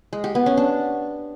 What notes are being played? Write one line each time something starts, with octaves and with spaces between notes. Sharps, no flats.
G#3
G4
B3
C#4
D4